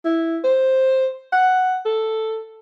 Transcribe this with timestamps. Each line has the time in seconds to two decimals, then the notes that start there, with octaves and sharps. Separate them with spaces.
0.05 E4
0.44 C5
1.33 F#5
1.85 A4